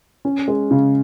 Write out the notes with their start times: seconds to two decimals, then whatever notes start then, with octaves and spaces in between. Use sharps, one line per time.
0.25 C#4
0.48 G#3
0.71 C#3